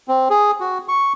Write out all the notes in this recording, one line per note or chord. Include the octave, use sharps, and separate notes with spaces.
C4
G#4
F#4
C#6